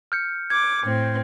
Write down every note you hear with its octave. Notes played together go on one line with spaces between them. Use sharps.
F6 G6 C#7
D6 G#6
A2 C4